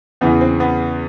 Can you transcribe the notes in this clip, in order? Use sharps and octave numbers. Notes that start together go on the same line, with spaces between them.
E2 C#3 E3 B3
C4
B3